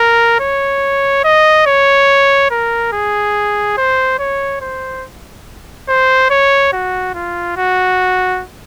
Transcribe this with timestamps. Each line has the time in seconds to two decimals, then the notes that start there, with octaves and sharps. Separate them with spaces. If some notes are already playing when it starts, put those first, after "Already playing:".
Already playing: A#4
0.40 C#5
1.24 D#5
1.66 C#5
2.50 A#4
2.92 G#4
3.77 C5
4.19 C#5
4.61 C5
5.89 C5
6.30 C#5
6.73 F#4
7.15 F4
7.57 F#4